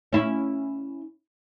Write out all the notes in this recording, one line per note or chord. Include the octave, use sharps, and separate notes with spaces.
C#4 E4